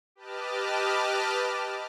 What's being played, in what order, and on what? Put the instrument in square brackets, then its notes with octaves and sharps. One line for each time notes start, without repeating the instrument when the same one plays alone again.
[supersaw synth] G4 B4 D#5 A5 D6 F6